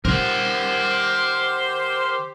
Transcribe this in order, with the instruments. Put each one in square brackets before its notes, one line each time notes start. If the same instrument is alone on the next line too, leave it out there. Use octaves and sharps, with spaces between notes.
[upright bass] D#3 [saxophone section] G4 C5 [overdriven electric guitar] A#4 F#5